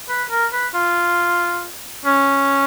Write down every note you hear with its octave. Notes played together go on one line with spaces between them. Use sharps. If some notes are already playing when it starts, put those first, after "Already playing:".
B4
A#4
B4
F4
C#4